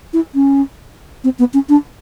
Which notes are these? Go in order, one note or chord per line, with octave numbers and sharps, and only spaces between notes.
E4
C#4
C4
B3
C#4
D4